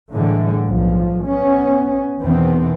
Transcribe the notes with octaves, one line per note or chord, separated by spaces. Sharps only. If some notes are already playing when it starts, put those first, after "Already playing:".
A2 D3 E3 G3 G#3
B1 G2 F3
B3 C#4
E2 B2 D#3 E3 B3 C4